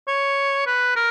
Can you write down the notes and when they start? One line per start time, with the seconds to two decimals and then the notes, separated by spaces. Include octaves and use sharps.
0.07 C#5
0.66 B4
0.96 A#4